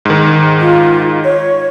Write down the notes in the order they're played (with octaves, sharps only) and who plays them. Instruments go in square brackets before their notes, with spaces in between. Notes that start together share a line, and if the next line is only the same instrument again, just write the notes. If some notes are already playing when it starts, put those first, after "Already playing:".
[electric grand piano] G#2 D#3
[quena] F4
C#5